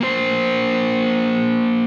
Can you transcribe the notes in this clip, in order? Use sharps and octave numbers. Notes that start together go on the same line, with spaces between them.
A#3 C5